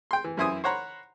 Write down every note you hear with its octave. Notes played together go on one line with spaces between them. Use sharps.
G5 C6
E3
F#2 E3 E4 C5 G#5 D#6
C5 C#5 F#5 A#5 B5